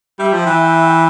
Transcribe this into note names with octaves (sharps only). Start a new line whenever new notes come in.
G3 E5 G5
F3
E3